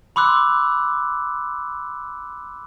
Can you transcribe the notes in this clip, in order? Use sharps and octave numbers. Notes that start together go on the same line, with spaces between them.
B5 C6 D6 E6 F#6